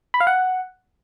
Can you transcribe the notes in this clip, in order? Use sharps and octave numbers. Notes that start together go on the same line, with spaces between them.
B5
F5
F#5